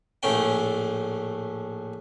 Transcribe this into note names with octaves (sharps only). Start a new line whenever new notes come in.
A#1 A2 A3 C#4 G5